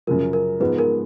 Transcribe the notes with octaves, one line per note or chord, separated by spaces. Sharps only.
F#2 C#3 F3 A#4
A#4
G#2 F3 G#3 B3 B4
A#4